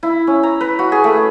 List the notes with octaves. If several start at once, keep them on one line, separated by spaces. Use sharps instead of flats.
E4
C#4
A#5
B4
F#4
G#4
A3